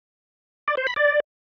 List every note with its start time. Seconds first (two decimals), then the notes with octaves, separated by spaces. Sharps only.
0.68 D5
0.77 C5
0.87 B5
0.96 D5